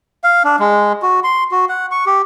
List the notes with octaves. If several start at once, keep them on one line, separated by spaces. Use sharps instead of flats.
F5
D4
G#3
F#4
C6
F#4
F#5
C#6
G4